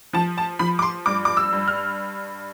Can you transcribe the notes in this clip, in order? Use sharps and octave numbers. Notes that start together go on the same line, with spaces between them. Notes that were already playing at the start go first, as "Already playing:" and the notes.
F3 A5
A5
F3 B5
D6
C6
G2 D6
D6
E6
G2
F6